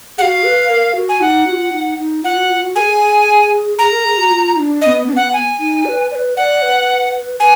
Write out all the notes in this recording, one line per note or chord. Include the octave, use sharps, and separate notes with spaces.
G#4 F#5
F#4 F5
B4
A#4
F#4
G#5
D#4 F#5
F#4
F4
D#4
D#4
F4 F#5
F#4
F4
F#4
G#4 A#4 G#5
G#4 A#5
A#4
G#4
F#4
F4
D#4
D4
D4 D#5
B3
D4
B3 F#5
G#5
D#4
D5
B4
D5
B4
D5 F#5
B4
B4 G#5